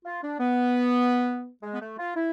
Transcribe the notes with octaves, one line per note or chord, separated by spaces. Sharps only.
F4
D4
B3
G#3
B3
A3
F4
E4